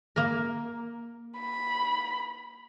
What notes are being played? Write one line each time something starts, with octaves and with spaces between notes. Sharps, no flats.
A#3 A#4
B5